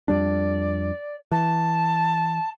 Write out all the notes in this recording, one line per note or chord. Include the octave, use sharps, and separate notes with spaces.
F2 G3 D4 D5
E3 A5